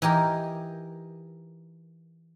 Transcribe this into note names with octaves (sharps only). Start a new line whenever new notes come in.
E3 D#4 G4 A#4